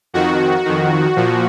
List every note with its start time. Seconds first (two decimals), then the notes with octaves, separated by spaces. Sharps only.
0.14 F2 D#3 F#4
0.65 F2 D#3
1.16 A#2 F3